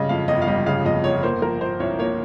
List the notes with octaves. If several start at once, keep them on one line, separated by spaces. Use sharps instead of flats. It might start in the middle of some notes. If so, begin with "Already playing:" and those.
Already playing: C#3 G3 D#5
F2 F5
G1 D#5
F5
G3 D#5
C#3 F5
F2 D#5
G1 C#5
A#3 C5
F3 A#4
A#2 C5
C2 C#5
A#3 C#5